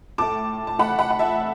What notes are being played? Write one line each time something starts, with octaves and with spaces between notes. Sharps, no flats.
A2 A3 A5 D6
A5
A2 A3 F#5 B5
F#5 B5
F#5
E5 A5